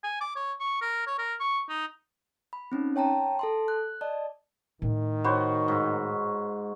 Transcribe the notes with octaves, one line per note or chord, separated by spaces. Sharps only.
G#5
D6
C#5
C#6
A#4
C#5
A#4
C#6
D#4
B5
C4 C#4 D#4
C#5 G5 A5 A#5
A4 A5 C6
F#6
D5 D#5 A5
A2 D#3
F#4 C5 C#5 B5
G#2